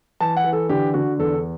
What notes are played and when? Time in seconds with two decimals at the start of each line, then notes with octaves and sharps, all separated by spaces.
0.20 E3 A5
0.37 F#5
0.44 E3
0.53 A4
0.69 D3 G4
0.94 D3 F#4
1.19 E2 A4